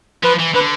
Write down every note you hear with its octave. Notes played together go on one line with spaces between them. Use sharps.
F3 B4
E3
D3 B4